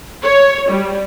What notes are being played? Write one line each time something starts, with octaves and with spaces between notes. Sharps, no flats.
C#5
G3